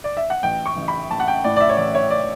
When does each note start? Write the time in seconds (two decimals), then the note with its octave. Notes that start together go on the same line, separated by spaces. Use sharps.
0.04 D5
0.17 E5
0.30 F#5
0.43 A1 G5
0.66 C#6
0.76 A1
0.88 B5
1.10 A1 A5
1.20 F#5
1.28 G5
1.44 A2 D5
1.56 D5
1.61 E5
1.69 C#5
1.77 A1 D5
1.95 C#5
2.10 D5